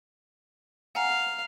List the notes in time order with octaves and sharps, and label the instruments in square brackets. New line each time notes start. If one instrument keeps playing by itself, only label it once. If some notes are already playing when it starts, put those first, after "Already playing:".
[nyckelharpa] F5 [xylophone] F#5 G#5 A#5